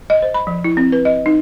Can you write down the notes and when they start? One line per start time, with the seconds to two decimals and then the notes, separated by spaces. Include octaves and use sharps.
0.10 D#5
0.22 C5
0.34 B5
0.47 F3
0.64 E4
0.77 C4
0.92 B4
1.05 D#5
1.26 D#4